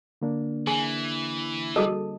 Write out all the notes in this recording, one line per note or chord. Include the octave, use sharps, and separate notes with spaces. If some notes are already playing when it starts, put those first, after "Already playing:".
D3 A#3 D4
E3 G#4 G#5
G3 F#4 G#4 A4 D#5 A5